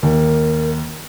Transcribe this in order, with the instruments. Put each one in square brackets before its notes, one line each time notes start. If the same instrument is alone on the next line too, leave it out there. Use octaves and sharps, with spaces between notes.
[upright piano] D#2 [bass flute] A#4